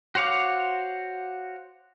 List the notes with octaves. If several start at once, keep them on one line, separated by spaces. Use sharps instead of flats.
F#4 C5 C#5 F5 D6